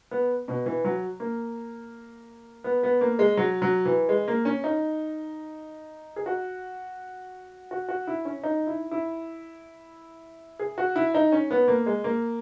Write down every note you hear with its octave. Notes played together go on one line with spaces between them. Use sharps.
B3
B2
E3
F#3
A#3
B3
B3
A#3
G#3
F#3
F#3
E3
G#3
A#3
C#4
D#4
G#4
F#4
F#4
F#4
E4
C#4
D#4
E4
E4
G#4
F#4
E4
D#4
C#4
B3
A#3
G#3
A#3